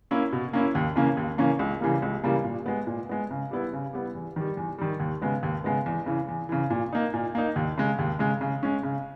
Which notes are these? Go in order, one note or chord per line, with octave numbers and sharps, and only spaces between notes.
A#3 C#4 E4
B2
A#3 C#4 E4
D#2
C#3 E3 A#3 C#4
D#2
C#3 E3 A#3 C#4
C#2
C#3 E3 G3 A#3
C#2
C#3 E3 G3 A#3
A#2
G#3 B3
A#2
G#3 B3
C#3
G3 B3 E4
C#3
G3 B3 E4
E2
D#3 G3
E2
D#3 G3
D#2
C#3 G#3 B3
D#2
C#3 G#3 B3
E2
C#3 E3
E2
C#3 E3
A#2
A#3 D#4
A#2
A#3 D#4
D#2
C#3 G#3
D#2
C#3 G#3
C#3
G#3 C#4
C#3